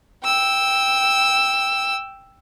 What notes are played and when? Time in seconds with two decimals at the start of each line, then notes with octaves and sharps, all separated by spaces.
0.24 G5 E6